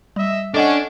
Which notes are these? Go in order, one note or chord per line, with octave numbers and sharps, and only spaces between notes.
G3 D#5 E5
C#4 D4 A4 D#5 F#5